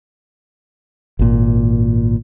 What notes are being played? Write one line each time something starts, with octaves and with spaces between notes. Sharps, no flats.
G#1 A#2